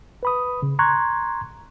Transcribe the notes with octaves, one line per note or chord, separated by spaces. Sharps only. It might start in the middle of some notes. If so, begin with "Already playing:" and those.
B4 B5 D#6
C#3
A#5 C6 C#6 F#6 G#6